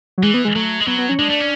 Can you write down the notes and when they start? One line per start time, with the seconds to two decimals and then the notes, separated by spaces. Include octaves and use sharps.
0.18 F#3
0.23 E3 G#3
0.34 B3
0.45 G#3
0.55 F#3 A3
0.80 G#3
0.87 F#3 B3
0.98 B3
1.09 C#4
1.19 G#3 D4
1.30 A3
1.40 C#4